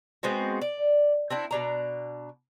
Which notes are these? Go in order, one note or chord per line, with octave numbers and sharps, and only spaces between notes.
G#3 B3 C4 F#4
D5
C4 D4 E4
B2 D4 A#5